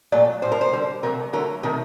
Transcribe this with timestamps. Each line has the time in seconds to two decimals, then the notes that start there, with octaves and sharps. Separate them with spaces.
0.12 A#2 F#3 A3 D5
0.42 A2 G3 C5
0.52 A#4
0.61 C5
0.73 D3 G3
1.03 C3 F#3 A3 A#4
1.33 D3 F#3 A3 A#4
1.63 C3 D#3 A3 A#4